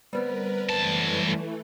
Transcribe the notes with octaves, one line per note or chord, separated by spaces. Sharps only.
D2 G3 B3 C4 A#4 B4
F#2 E3 A3 A5